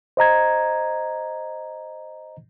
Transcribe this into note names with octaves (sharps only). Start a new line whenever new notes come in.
C5 D#5 A#5 G#6